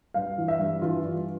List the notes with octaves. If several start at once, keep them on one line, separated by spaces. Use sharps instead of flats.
G2 F5
E3
E5
G2
E3 F4
G2